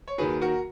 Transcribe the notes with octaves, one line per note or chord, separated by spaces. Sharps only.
C#5
D#2 D#3 F#3 G#4 B4
F#4 A#4